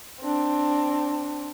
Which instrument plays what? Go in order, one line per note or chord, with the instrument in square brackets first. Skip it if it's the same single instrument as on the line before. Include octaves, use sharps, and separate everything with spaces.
[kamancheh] C4 D4